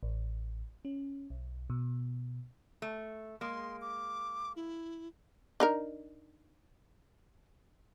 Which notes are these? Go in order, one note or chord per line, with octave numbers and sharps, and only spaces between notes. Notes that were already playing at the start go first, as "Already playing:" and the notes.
A1
C#4
B1
B2
A3
G#3 A#3 C6
D6
E4
D4 D#4 A#4